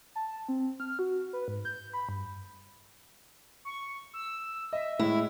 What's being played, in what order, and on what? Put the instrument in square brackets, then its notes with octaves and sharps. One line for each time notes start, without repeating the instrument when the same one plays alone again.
[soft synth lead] A5
C4
F6
F#4
B4
G#2
G6
B5
G2
[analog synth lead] C#6
E6
[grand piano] D#5 [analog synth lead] E5
[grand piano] A2 G#3 [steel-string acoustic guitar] E4